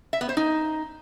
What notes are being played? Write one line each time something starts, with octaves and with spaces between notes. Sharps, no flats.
E5
B3
C5
D#4